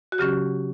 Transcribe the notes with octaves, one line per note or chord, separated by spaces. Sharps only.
F#4
C#3 F#3 C#4 G4